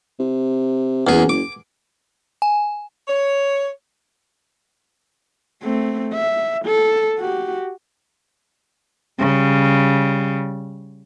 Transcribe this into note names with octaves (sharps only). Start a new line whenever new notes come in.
C3
F#1 E2 G#4
D6
G#5
C#5
A3 C4
E5
A4
F#4 G4
C#3 G3